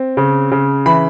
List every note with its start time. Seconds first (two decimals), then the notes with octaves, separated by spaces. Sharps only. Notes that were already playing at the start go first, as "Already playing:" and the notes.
Already playing: C4
0.17 C#3
0.51 C#3
0.86 E3 B5